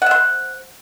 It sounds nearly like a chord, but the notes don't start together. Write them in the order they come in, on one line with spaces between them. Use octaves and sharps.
F#5 E5 C5